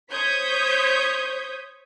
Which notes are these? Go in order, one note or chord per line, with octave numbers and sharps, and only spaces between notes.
C5 C#5 D#6 G6 G#6 B6